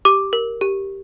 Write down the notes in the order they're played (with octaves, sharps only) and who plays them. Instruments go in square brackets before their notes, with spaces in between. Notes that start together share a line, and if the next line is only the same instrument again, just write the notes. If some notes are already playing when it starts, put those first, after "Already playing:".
[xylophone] G4 D6
A#4
G4